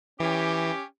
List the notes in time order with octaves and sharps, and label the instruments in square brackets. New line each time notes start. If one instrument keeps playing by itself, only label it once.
[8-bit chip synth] E3 [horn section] C#4 G4